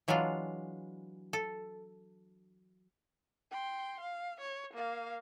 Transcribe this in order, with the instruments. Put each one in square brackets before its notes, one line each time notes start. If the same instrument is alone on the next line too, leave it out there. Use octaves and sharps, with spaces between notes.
[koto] E3 F#3 G#3 D4 F4
A4
[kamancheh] G5 C6
F5
C#5
A#3 F5